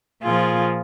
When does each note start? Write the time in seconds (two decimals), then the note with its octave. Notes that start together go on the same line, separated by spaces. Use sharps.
0.23 A#2 F3 F4 G#4